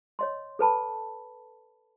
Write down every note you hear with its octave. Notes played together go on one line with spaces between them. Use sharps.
C#5 D#5 C6
A4 B4 A5 B5